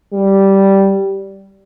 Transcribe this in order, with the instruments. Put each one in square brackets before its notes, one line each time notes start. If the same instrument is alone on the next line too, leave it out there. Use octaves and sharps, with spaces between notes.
[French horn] G3